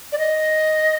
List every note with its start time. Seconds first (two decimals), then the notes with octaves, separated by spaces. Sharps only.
0.12 D5
0.18 D#5